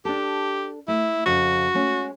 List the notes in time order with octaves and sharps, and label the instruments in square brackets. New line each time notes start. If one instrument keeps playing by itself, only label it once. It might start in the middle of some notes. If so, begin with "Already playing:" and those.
[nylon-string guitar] D4 A4 [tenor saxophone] G4
[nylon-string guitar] A3 [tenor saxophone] E4
[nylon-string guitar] F2 C#3 [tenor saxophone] F#4
[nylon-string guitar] G#3 A3 C#4